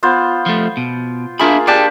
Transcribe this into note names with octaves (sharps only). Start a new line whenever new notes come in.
B3 F4 C5
F3 A3
B2
A#3 D4 F4 G#4 E5 B5
D4 G4 G#4 D5 G5 A5